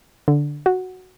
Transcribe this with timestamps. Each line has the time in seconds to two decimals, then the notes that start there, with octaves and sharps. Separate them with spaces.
0.28 D3
0.66 F#4